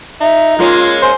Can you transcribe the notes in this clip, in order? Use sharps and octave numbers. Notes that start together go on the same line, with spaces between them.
D#4 E5
G#3 A#3 C#4 F4
C5 G#5